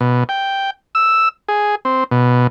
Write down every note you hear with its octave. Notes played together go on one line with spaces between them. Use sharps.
B2
G5
E6
G#4
C4
B2